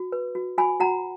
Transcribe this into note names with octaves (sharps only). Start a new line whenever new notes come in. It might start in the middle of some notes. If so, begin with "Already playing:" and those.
Already playing: F#4
B4
F#4
F#4 G#5 B5
F#4 F#5 A#5